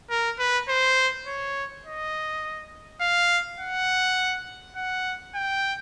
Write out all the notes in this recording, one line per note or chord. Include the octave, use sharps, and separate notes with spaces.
A#4
B4
C5
C#5
D#5
F5
F#5
F#5
G5